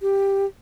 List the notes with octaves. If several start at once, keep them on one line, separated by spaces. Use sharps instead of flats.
G4